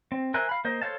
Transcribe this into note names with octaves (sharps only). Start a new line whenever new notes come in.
C4
A#4 C5 E5 G#5 F#6
F5 B5
A#3 C5 D#5
A4 C5 C#5 F5 A5